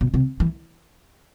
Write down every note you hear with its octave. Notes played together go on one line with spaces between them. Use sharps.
B2
C3
E3